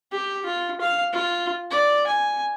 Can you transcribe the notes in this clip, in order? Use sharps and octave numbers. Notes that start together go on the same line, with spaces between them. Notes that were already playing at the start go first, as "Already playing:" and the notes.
G4
F4
F5
F4
D5
G#5